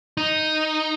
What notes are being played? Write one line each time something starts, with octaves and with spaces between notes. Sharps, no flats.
D#4